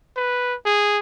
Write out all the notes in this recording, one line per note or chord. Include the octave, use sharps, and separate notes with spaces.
B4
G#4